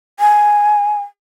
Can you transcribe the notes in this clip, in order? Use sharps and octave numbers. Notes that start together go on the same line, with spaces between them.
G#5